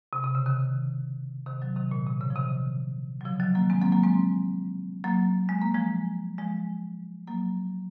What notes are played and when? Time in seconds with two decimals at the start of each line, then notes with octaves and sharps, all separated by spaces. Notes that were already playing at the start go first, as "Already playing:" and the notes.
0.13 C3
0.24 C3
0.35 C#3
0.46 C3 D#3
1.46 C3 D#3
1.62 D#3 F#3
1.77 C3 D#3
1.91 A#2
2.06 C3
2.21 C#3
2.30 F3
2.36 C3 D#3
3.21 F#3
3.25 C#3 F3
3.40 D#3 F#3
3.55 F#3 A#3
3.70 G#3 C4
3.81 F#3 A#3
3.92 F#3 A#3
4.03 G#3 C4
5.04 F#3 A#3
5.49 G#3
5.62 A#3
5.74 F3 G#3
6.38 F3 G#3
7.27 F#3 A#3